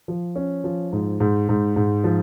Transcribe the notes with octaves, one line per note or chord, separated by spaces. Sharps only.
F3
C#4
F3
G#2
G#2
G#2
G#2
F3